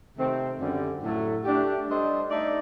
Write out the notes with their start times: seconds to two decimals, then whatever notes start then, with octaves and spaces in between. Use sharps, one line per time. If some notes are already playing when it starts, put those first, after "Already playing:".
0.16 C3 D#3 A3 C4
0.59 F#2 D3 G3
1.02 A2 F#3 A3
1.44 A3 D4 G4
1.86 G3 D4 A4 C5 D#5
2.30 A3 D#4 A4 D5